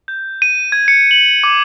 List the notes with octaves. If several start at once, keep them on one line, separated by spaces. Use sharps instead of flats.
G6
D#7
G#6
C#7
F#7
D6